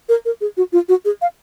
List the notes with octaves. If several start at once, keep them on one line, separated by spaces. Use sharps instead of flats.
A#4
A#4
G#4
F#4
F4
F#4
G#4
F5